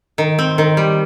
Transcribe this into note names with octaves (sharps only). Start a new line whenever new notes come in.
D#3
C4
D#3
G3